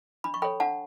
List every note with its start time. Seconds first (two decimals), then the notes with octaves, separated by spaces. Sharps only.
0.24 D4 B5
0.34 C#6
0.42 A4 C#5 G5 B5
0.60 D4 F#5 A5